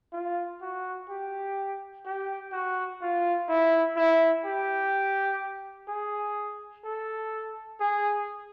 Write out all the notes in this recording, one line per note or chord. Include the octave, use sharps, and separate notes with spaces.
F4
F#4
G4
G4
F#4
F4
E4
E4
G4
G#4
A4
G#4